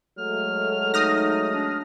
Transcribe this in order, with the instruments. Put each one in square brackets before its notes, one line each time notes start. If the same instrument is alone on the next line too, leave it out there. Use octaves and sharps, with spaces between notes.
[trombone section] F#3 G#3 A3 [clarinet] F6
[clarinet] D#4 [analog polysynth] D#6 F6 A#6
[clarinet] D4